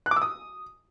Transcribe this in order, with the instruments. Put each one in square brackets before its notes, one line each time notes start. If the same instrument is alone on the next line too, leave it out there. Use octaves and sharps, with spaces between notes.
[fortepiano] F#6
D6
E6
D#6